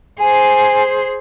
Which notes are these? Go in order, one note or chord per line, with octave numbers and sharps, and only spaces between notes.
G#4 C5 G#5